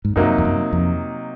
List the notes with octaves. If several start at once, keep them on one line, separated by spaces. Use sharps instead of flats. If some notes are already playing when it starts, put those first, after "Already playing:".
G#2
F#2 C3 F#3 A#3 D#4
F2
F#2
F2